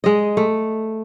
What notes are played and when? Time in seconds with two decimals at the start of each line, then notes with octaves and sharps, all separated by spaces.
0.04 G#3 D#5
0.37 A3